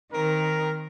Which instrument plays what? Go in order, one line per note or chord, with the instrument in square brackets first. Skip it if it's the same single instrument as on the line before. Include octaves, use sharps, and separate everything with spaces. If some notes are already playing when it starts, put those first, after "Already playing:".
[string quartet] D#3 [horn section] C4 A#4